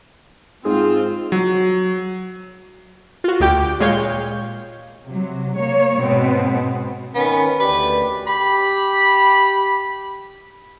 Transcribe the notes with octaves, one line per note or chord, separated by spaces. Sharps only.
G#2 C4 F4 G#4
F#3
F4 F#4
D2 G4 G5 D6
A#2 G#3 C#5 F5 G6
C3 F#3
A#3 C#5
G#2 B2 B3 C4
D#3 B3 C#4
D2 G4 B4 D5
G4 B5